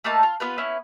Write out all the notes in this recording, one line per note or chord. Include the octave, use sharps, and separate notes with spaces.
A3 A#3 D#4 A5
F4
B3 F4 B4
B3 C#4 E4